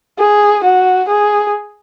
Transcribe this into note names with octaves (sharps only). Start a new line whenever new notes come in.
G#4
F#4
G#4